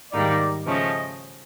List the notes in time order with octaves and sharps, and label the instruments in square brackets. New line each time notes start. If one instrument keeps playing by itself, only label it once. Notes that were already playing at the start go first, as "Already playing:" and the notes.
[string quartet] G#2 D#3 G3 A#3 D#4 [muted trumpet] D5
[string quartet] C#3 F3 A3 C#4 [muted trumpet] D#5